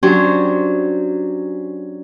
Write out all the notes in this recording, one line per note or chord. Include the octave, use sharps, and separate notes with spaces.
F#3 C#4 D4 G4 C5